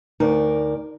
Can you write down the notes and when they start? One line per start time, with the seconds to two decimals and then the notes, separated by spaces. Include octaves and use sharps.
0.20 D2 D#4 A#4 D5